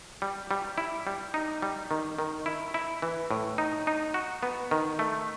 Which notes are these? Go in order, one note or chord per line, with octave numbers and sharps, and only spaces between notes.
G3
G3
E4
G3
D#4
G3
D#3
D#3
E4
E4
E3
A2
D#4
D#4
F#4
B3
D#3
A3